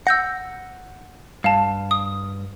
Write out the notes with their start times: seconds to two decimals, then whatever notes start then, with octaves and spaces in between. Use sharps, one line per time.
0.07 F#5 E6 G6 A#6
1.44 G2 F5 A5
1.91 D#6